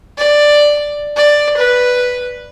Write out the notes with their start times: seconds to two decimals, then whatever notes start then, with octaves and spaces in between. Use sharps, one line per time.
0.18 D5
1.17 D5
1.57 B4